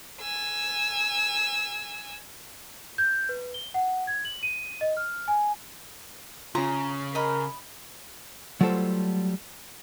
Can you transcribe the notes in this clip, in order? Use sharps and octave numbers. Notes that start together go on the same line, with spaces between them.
G#5 E6
G6
B4
G7
F#5
G#6
F#7
D#7
D#5
F6
G#5
C#3 C#4 F4 A#5
A#4 D#5 B5
F#3 G3 A3 F4 A4 C5